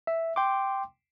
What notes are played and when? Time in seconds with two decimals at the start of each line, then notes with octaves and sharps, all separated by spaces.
0.07 E5
0.36 G5 C6 D6